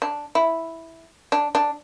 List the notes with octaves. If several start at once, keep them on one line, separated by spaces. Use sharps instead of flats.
D4
E4
D4
D4